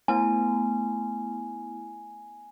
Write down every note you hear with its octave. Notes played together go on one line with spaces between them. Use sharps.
A3 B3 E4 G#5